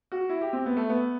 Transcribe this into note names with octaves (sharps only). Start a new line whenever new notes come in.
F#4
E4
G4
C4
B3
A3
B3